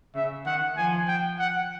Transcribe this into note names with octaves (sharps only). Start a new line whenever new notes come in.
C#3 E5
D#3 F#5
F3 G#5
G5
F#5